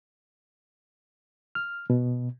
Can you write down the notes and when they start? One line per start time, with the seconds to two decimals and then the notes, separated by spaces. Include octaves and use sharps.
1.55 F6
1.90 B2